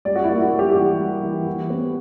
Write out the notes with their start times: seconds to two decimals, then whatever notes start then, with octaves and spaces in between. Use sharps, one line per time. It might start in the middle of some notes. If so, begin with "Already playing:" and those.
0.05 G3 D5
0.15 F#4
0.24 E4
0.29 A#3
0.41 F#4
0.53 G3
0.59 G4
0.71 G4
0.76 E3 F#4
1.00 G3
1.23 E3
1.47 E3
1.70 B3